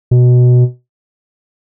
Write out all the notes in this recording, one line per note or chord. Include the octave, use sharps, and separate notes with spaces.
B2